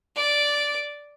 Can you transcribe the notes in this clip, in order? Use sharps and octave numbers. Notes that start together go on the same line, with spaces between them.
D5